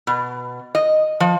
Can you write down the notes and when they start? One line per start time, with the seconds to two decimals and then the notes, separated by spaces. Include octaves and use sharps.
0.07 B2
0.75 D#5
1.20 F3